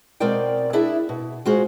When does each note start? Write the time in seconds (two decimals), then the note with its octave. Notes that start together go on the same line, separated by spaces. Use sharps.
0.20 B2 G#3 C4 A#4 D5 G5
0.73 D4 E4 G#4 D5 E5
1.09 B2
1.46 G#3 F4 F#4 G#4 C5